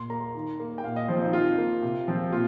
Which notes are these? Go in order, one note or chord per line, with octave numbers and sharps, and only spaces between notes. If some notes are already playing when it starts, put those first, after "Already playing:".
Already playing: A#2 C6
A#3 A#5
D#3
A#3
G5
A#2 F5
D#5
F3 C4 C5
D#4
D#3 F4
A#3
C3
F3 C4
A#2 F4